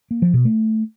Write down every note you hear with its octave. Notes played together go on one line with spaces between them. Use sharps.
A#3
F3
B2
A3